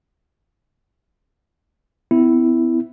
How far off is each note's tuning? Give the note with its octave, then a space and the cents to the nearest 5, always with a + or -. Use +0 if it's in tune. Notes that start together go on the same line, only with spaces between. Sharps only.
B3 +45 E4 +0